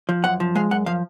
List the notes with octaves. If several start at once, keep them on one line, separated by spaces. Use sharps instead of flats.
F3
F#2 F#5
F3
G#3 F5
F#2 F#5
F3 F5